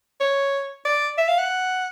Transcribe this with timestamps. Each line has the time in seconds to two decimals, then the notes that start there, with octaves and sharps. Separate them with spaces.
0.21 C#5
0.85 D5
1.18 E5
1.28 F5
1.39 F#5